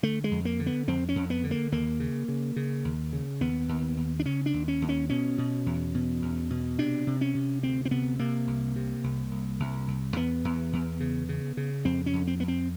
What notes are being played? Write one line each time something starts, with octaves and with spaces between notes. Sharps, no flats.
D3 A3
G#3
F2
A#3
D3
B3
F2 C4
C#4
F2
B3
D3
A#3
D#2 A#3
C#3
C#3
C#3
D#2
C#3
D#2 B3
D#2
D#2
D4
C#3 C#4
D4
D#2
C#4
D#2
C#4
B2 C#4
B2
E2
B2
E2
B2
C3 D4
C3
C#4
C3
D2 C4
C4
C3 B3
C3 A#3
C2
C3
C2
C2
C2
C2
E2 B3
E2
E2
C#3
C#3
C#3
F2 C4
C#4
F2
C4
F2 B3
C4